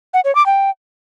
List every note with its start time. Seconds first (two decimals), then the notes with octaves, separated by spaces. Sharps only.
0.14 F#5
0.24 C#5
0.35 D6
0.46 G5